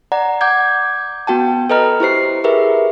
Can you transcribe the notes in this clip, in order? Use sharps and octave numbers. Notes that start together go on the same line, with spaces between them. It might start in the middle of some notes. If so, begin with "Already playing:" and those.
D5 F#5 A#5
F#5 D6 G6 G#6
B3 F#4 G5 A5
A4 B4 D#5 A#5 F6
E4 G4 C5 C7
G4 G#4 A#4 B4 E5